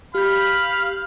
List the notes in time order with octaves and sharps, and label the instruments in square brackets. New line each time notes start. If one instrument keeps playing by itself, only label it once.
[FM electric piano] G4 G6 [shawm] F5 [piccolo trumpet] B5